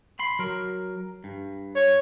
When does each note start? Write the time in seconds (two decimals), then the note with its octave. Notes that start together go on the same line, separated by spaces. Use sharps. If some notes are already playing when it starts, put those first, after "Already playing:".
0.19 B5 C6
0.39 F#3 A#4
1.24 G2
1.76 C#5